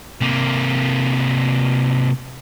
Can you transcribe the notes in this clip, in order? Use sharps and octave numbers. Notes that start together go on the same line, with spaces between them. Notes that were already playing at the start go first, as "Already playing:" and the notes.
C3 A#3